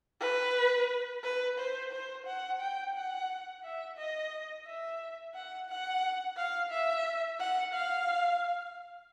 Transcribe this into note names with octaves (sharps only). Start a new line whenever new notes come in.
B4
B4
C5
C5
F#5
G5
F#5
E5
D#5
E5
F#5
F#5
F5
E5
F#5
F5